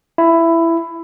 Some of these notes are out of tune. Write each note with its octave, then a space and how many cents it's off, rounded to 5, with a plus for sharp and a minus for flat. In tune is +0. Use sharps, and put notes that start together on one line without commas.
E4 +10